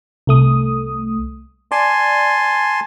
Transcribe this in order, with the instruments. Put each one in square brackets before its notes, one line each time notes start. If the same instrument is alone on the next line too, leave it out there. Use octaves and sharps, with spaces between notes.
[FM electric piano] C2 A3 D#6
[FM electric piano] D5 [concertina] G#5 A5 C6